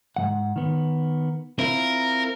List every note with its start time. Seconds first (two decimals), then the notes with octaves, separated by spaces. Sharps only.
0.16 G#2 F3 F#5
0.56 D#3 B3
1.59 C4 E4 F4 A#4